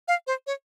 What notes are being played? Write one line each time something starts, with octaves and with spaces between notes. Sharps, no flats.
F5
C5
C#5